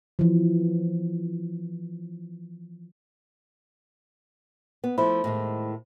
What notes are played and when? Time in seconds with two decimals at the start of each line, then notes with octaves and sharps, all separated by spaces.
0.19 E3 F3
4.84 B3
4.98 F3 A3 E4 C5 B5
5.24 A2 D#3 G#3